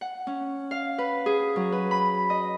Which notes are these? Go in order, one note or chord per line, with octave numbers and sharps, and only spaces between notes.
F#5
C#4
F5
B4
G#4
F#3
B4
B5
D#5